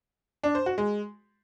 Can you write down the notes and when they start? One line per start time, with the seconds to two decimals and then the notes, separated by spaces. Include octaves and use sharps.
0.43 D4
0.55 C5
0.66 F#4
0.78 G#3